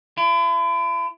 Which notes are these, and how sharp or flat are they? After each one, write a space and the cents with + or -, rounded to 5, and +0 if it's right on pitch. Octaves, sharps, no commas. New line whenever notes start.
E4 +40